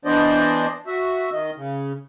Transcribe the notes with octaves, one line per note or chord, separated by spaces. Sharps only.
E3 B3 D4 C5 D5 D#5
F#4 E5
D#3 D#5
C#3